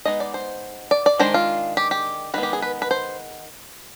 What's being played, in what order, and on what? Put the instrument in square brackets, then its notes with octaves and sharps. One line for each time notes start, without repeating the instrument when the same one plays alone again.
[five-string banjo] G#3 B3 D#4 D#5
D5
C5
D5
D5
D#3 G#3 D4 C5
F4
G4
G4
D#3 G#3 B3 B4
G4
G#4
B4
B4
C5